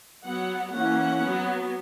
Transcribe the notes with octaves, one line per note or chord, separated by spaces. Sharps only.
F#3 B3 F#5
E3 A#3 C#4 F#5
F#3 B3